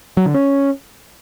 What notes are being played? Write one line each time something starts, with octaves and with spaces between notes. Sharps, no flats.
F#3
D3
C#4